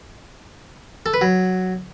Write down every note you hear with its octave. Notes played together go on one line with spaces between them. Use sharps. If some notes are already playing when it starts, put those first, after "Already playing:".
A4
B4
F#3